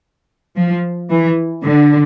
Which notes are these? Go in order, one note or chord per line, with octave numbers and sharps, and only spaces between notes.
F3
E3
D3